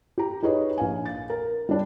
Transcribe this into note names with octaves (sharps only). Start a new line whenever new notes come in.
G4 A#5
D#4 G4 G#4 B4 C#5 D#5
A#1 F5 G#5
A6
A#4
G3 D4